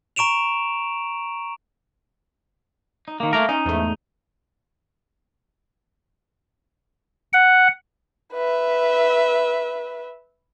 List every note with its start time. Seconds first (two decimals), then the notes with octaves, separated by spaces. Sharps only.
0.16 A#5 C#6 D7 E7 F7
3.08 D#4
3.20 D#3 A#3
3.33 A3 A#3 A#4 A#5
3.49 C#4 D#4
3.65 E2 G#2 A3
7.33 F#5
8.34 B4 E5